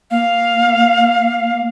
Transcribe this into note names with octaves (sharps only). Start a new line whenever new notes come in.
A#3 F5